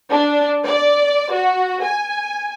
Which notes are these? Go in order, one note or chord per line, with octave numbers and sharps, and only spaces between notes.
D4
D5
F#4
G#5